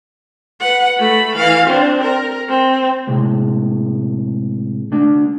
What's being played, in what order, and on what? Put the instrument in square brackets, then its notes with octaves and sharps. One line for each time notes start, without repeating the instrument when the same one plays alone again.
[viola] B4 F#5
A3 B5
E3 F5
C4 D4
A#4
C4
[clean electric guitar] A2 C3 G#3
A3 D4